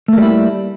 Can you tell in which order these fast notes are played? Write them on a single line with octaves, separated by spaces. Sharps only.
A3 A#3 G3 E4